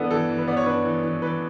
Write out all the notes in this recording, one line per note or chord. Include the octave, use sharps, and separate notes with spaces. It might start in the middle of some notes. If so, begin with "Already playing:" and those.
Already playing: E3 B3 D4 A4 B4
E3 A4
E3
B4
B3 D5
C#5
D4 B4
E3
E3
E3 B4